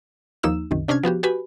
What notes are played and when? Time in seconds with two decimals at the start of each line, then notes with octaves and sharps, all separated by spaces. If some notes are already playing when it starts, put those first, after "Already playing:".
0.43 D#2 F3 A#3 D#4 E6 E7
0.71 C2 F#2 D#3
0.88 C3 C#4 D4 F6 G#6
1.03 F3 B3 F#4 G4
1.23 F#4 G4 B4 G#5 B5